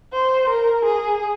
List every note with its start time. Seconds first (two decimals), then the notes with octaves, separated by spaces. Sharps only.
0.13 C5
0.50 A#4
0.86 G#4